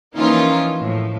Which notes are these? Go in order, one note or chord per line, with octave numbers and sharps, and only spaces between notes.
E3 F3 A#3 C#4 D#4 F4
A2 F3